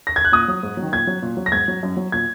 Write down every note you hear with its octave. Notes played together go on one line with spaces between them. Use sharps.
A#6
G#6
F#6
A#2 D#6
F#3
G#2
F#3
D#3
A#2 G#6
F#3
A#2
F#3
A#6
G#2 G#6
F#3
F#2
F#3
A#2 G#6